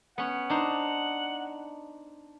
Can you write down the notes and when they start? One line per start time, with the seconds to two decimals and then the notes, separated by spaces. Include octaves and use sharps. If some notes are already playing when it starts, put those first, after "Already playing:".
0.18 B3 C#4 F#5
0.50 D4 D#4 C5